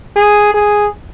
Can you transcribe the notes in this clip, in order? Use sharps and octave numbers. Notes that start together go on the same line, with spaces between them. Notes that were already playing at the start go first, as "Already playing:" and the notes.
G#4
G#4